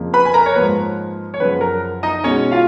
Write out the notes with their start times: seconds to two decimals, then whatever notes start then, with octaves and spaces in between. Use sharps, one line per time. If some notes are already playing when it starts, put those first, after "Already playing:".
Already playing: F2 C#3 F3 A#3
0.14 B4 B5
0.25 G#5
0.34 A#4 A#5
0.46 C#5
0.55 G#2 F3 A#3 B4
1.34 C#5
1.40 F#2 C#3 F3 B4
1.61 A#4
2.03 D#4 D#5
2.23 B2 G#3 C#4 C#5
2.51 F4 F5